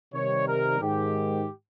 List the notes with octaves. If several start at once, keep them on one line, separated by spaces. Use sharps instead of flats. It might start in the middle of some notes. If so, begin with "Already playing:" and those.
C3 D#3 G3 C#5
A#4
G#2 D#3 G#3 G4